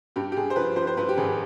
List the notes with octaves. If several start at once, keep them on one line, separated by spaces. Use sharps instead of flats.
G2 G4
G4
G2 G#4
C5
F3 B4
F3 C5
C5
G2 B4
G4
G#1 G#4